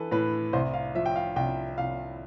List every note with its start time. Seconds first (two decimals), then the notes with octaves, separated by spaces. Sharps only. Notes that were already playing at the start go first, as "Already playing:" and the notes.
Already playing: E3 A4 B4
0.11 A2 B4
0.53 C2 C5
0.73 F5
0.95 F3 E5
1.06 G5
1.16 F5
1.36 C2 G5
1.78 C2 F5